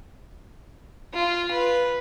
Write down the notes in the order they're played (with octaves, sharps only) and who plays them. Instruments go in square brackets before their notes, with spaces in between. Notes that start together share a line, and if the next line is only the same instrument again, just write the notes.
[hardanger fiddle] F4
B4